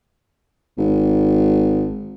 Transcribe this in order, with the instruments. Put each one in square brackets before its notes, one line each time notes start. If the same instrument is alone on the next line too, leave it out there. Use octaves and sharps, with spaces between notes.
[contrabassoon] G#1